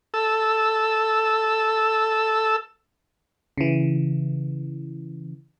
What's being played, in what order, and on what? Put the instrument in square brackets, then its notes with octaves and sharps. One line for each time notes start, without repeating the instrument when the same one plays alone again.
[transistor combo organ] A4 E6
[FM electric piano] C#3 E3